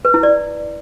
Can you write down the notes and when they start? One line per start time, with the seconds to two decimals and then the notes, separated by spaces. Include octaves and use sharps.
0.05 B4
0.14 E4
0.23 D5